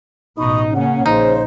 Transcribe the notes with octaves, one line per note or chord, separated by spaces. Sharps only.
A1 B2 D#4 B5 C#6 D#6
C#3 A#3 C#4 F#5
A#1 C#3 D#4 C5